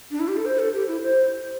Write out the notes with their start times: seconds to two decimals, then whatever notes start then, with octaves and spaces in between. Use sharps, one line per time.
0.11 D4
0.20 E4
0.28 G4
0.37 A4
0.46 C5
0.59 A4
0.73 G4
0.88 E4
1.01 C5